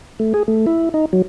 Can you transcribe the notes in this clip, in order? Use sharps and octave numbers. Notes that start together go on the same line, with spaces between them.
A3
G#4
A3
E4
D#4
F#3